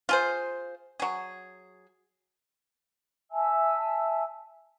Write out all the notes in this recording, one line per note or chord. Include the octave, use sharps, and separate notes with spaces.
F4 G#4 C5
F#3 G#4
E5 G#5 A5 E6